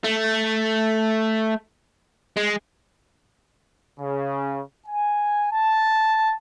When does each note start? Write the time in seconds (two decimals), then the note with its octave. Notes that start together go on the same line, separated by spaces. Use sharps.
0.04 A3
2.37 G#3
4.00 C#3
4.87 G#5
5.52 A5